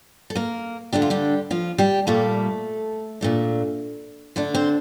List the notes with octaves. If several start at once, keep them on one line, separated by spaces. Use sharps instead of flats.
A4
A#3 A#4
D3 A3 D4 G4
F4
G3 G4
F3 F4
G3 G4
A#2 G3 A3 A#3 A4
A#2 A3 D4
D3 A3 D4
C4 C5